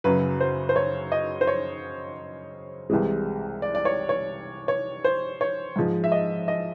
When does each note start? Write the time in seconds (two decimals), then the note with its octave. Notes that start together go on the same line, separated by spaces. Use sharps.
0.04 F#2 C#3 F#3 B4
0.40 C5
0.69 C5
0.76 C#5
1.12 D#5
1.41 C5
1.47 C#5
2.90 C2 C3 E3 G#3
3.62 D5
3.75 D5
3.85 C#5
4.09 C#5
4.68 C#5
5.04 C5
5.41 C#5
5.76 G#2 F3 G#3
6.04 E5
6.12 D#5
6.48 D#5